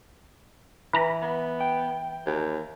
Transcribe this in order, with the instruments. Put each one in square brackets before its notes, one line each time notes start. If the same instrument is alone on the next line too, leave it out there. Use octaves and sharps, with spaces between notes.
[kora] E3 [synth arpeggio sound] B4 A#5 B5
[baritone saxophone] B3
[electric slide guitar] G5
[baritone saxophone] D#2